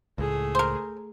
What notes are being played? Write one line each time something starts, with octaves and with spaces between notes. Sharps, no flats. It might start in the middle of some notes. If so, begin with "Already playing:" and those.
C#2 A2 A3 G#4
A#4 C5